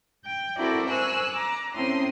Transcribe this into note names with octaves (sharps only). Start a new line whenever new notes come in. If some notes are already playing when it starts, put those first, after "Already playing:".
G5
C4 E4 F#4 A4 A#4 D5
C5 G#5 C#6 E6 F#6
A#5 D6
A2 C4 C#4 C6 D#6